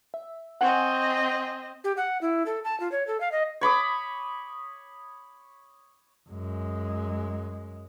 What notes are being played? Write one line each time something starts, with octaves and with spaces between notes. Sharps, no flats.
E5
C4 D#5 F#5 G#5 C#6
G4
F#5
E4
A4
A5
F4
C#5
A4
F5
D#5
C#5 B5 D6 D#6
F#2 G#3